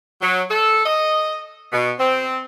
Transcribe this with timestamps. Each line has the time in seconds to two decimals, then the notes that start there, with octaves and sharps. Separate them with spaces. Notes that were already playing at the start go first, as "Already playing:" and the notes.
0.21 F#3
0.50 A4
0.85 D#5
1.72 B2
1.99 C4